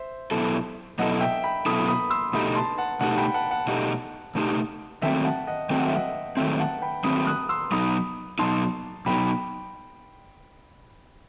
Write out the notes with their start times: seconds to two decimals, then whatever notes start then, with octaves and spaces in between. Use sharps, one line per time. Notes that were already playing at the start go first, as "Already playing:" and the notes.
Already playing: C5 E5
0.31 B2 F#3 B3 E4 A4
0.99 B2 F#3 B3 E4 A4 D#5 F#5
1.21 E5 G5
1.44 G5 B5
1.66 B2 F#3 B3 E4 A4 B5 D#6
1.88 B5 D#6
2.10 C6 E6
2.33 B2 A3 D#4 G4 B5 D#6
2.56 A5 C6
2.78 F#5 A5
3.01 B2 A3 D#4 G4 F#5 A5
3.18 G5 B5
3.34 F#5 A5
3.51 F#5 A5
3.67 B2 A3 D#4 G4
4.35 B2 A3 D#4 G4
5.02 D#3 F#3 A3 C4 E5 G5
5.25 F#5 A5
5.47 D#5 F#5
5.70 D#3 F#3 A3 C4 G5
5.78 F#5
5.87 E5
5.95 D#5 F#5
6.37 D#3 F#3 A3 C4 E5 G5
6.59 F#5 A5
6.82 G5 B5
7.04 D#3 F#3 A3 C4 B5 D#6
7.27 D#6 F#6
7.49 C6 E6
7.72 B2 F#3 B3 D#4 B5 D#6
8.39 B2 F#3 B3 D#4 A5 C6
9.06 B2 F#3 B3 D#4 G5 B5